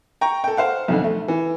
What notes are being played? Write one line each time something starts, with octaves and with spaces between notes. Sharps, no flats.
G5 A#5 C#6
A4 G5
C5 F5 F#5
B1 F2 D3
A3
E3